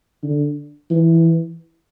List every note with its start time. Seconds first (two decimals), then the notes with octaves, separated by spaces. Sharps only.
0.24 D3
0.91 E3